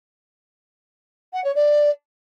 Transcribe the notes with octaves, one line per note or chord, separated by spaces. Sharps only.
F#5
C#5
D5